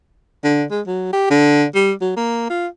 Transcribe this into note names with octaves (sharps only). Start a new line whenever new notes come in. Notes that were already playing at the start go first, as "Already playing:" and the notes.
D3
G#3
F#3
G4
D3
G3
F#3
A#3
F4